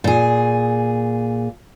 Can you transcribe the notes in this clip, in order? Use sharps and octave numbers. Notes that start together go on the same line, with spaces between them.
A#2 G#4